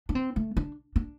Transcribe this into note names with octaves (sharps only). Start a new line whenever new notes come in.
D4
C4
A3
D4
D4